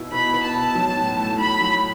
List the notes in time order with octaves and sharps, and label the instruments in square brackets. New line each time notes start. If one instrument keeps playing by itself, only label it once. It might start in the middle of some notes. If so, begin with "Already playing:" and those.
Already playing: [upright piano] B2 B3 E4
[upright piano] B2 [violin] B5
[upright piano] B3
[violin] A5
[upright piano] B2
F#3
A2
A3
[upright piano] A2 [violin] B5
[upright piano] F#3